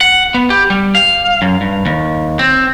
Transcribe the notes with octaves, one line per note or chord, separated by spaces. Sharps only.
F#5
B3
G4
G3
F5
F#2
G2
D#2
C4